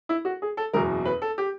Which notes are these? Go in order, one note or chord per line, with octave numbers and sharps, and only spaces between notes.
E4
F#4
G#4
A4
F#1 E2 B2 A#4
B4
A4
G4